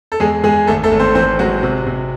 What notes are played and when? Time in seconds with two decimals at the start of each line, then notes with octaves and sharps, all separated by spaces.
0.12 A4
0.20 E2 G#3 G#4
0.44 E2 G#3 G#4
0.67 G#1 A3 A4
0.83 A3 A4
0.91 G#1
0.99 C4 C5
1.15 E3 C4 C5
1.39 F#3 G#3 F#4
1.63 C3
1.86 C3